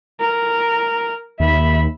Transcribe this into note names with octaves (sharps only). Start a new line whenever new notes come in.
A#4
D#2 E5 B5